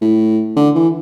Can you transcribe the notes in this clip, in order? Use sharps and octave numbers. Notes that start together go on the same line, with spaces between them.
A2
D3
E3